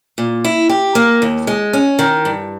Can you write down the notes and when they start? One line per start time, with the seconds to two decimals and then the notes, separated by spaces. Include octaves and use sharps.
0.18 A#2
0.44 E4
0.69 G4
0.95 A#3
1.22 D#2
1.47 G#3
1.73 C#4
1.99 D#3
2.25 G2